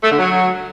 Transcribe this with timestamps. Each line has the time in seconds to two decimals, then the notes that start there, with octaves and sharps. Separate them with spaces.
0.04 A3
0.11 D3
0.19 F#3